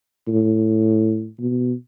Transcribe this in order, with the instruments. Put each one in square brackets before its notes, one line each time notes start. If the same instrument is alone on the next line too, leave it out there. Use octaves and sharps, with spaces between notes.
[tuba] A2
B2